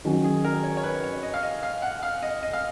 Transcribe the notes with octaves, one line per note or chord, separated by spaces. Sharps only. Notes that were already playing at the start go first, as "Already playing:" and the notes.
D#3 F#3 C#4 F#4
G#4
A#4
C#5
C#5
B4
C#5
D#5
F5
D#5
F5
F#5
F5
D#5
D#5
F5